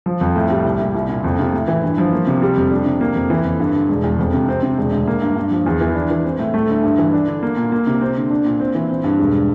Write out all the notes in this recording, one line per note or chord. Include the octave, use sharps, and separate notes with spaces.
F3
F2
A2
G3
C2
A#2
C2
A#2
F2
C3
A2
E3
G2
F3
A#3
C3
G3
F2
D4
C3
A#3
F2
E3
F2
G2
D3
E1
E2
F2
C3
C4
C3
E1
D2
A#3
G2
G2
F3
E2
E3
D4
E3
C4
A2
A3
D2
G2
E3
D4
D3
A#3
A#2
A#3
C3
C4
D3
D4
A#2
C4
E3
C4
G2
E1